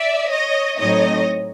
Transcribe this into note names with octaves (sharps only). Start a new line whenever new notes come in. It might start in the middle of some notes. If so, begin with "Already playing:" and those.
Already playing: D5 E5
C#5 D#5
A2 F#3 A3 C4 D#4 C#5 D#5